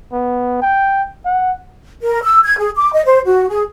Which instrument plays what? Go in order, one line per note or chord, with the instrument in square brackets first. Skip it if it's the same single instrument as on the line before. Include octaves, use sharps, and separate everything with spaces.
[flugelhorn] B3
G5
F#5
[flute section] A#4
E6
G#6
G#4
D6
D#5
C5
F#4
G#4